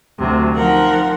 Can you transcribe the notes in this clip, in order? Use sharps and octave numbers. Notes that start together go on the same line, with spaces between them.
D2 C3 F#3
F3 D#4 A#4 F#5 G5